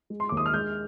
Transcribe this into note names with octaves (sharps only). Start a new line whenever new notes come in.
G#3
C6
D#2 D6
D#6
F6
G#3 G6